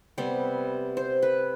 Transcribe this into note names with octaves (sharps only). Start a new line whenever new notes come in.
C3 G3 B3 C5
C5
B4